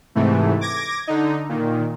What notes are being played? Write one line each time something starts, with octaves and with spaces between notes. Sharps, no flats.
G#2 C3 E3 A3
D6 G#6 A#6
D3 D#4
A#2 D#3